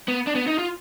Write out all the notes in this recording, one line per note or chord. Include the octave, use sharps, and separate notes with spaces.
B3
D4
B3
D#4
F4